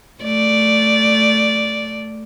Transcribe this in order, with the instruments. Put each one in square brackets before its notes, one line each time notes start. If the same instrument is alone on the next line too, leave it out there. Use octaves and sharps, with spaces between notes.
[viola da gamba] A3 D5